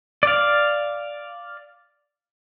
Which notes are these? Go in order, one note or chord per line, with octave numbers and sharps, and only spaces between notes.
D5 F5